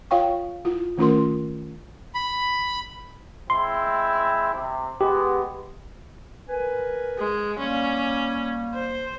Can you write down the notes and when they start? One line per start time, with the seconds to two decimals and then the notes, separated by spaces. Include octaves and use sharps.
0.11 F4 C#5 F5 G5 C#6
0.65 E4 F4
0.98 D#3 A3 C#4 F4 A#4 C6
2.15 B5
3.50 G#3 C4 E4 C6
4.54 C3
5.01 G#3 B3 G4
6.48 A#4 B4 G#5
7.19 G#3
7.59 G3 A#3 C#4
8.74 C5